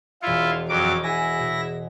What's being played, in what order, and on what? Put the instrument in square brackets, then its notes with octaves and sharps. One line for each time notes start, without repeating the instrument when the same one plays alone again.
[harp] E1 C#7 [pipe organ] E4 F4
[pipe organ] F2 F#3 D6
[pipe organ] E4 A#6 [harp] G#4 F#5 G#5
[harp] B2